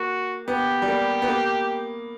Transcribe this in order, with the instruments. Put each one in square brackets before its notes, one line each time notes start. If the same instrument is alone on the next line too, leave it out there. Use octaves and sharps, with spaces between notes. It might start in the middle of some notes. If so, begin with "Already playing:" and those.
Already playing: [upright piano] A#3 [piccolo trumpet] F#4
[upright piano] B3 [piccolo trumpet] G4
[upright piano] G3
A#3
B3
A#3